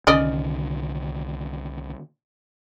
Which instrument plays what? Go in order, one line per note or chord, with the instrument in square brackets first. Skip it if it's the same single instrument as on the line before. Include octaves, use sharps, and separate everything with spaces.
[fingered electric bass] C2 D3 D#3 [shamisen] C#4 D5 D#5